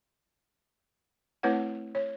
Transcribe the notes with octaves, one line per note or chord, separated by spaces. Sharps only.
A3 C4 E4 B4 C#5 F#5
C#5